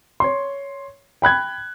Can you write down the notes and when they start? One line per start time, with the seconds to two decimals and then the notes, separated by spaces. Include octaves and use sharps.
0.20 C#5 C6
1.22 G5 B5 F#6 G#6